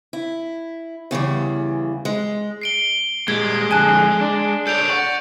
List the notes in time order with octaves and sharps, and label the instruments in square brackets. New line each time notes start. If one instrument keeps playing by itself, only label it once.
[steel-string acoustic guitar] E4
E2 C#3 E3 G3
G#3
[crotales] C7 D7 G7
[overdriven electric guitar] A#2 G3 [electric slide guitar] G#3 [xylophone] G#6
[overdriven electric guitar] F2 D3 [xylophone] G#5 A5 F#6
[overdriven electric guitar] D4
[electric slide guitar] A4 C5 C#5 [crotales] G6 D7 F7
[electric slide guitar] D5 [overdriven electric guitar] F#5 [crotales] C#6